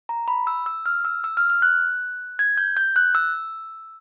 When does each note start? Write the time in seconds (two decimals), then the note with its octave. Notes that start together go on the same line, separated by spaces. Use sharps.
0.09 A#5
0.28 B5
0.47 E6
0.66 E6
0.86 F6
1.05 E6
1.24 E6
1.37 F6
1.50 F6
1.62 F#6
2.39 G#6
2.57 G6
2.77 G6
2.96 F#6
3.15 E6